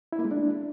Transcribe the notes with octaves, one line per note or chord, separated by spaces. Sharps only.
E4
A#3
G#3
D4